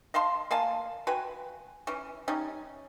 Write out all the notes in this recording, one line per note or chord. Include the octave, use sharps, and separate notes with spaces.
D#5 F5 A5 C6
A#3 F5 G#5 A5
F#4 B4 G5 G#5
E3 C#4
G3 C#4 D#4